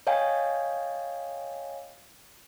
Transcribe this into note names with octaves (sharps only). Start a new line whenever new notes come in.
C#5 D#5 F5 G5 G#5